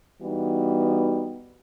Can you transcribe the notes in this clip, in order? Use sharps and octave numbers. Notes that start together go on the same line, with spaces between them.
E3 G3 B3 D#4 F#4